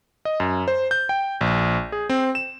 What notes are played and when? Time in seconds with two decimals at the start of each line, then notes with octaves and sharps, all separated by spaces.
0.25 D#5
0.40 F#2
0.68 C5
0.91 G6
1.09 G5
1.41 A#1
1.92 G#4
2.09 C4
2.35 E7